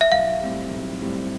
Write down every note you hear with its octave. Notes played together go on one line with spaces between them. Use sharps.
E5
B1 F5
A2 G3 C4 G4
B1
A2 G3 C4 G4